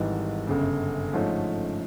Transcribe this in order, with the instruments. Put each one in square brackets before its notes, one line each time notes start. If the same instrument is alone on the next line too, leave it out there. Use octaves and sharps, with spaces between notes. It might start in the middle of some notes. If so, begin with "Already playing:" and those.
Already playing: [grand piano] G#1 G#2 E3 G3
G1 F#2 C#3
G#2 F3 A3 C#4